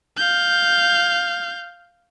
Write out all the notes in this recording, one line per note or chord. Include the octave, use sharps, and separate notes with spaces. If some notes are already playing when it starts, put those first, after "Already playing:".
F5 G6